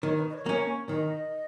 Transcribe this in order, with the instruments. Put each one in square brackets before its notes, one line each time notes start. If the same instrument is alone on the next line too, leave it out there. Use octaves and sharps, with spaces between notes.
[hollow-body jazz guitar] D#3 [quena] C#5
[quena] B4
D#5
C#5
[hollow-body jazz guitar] A#3 C#4
[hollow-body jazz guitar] D#3 [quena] D#5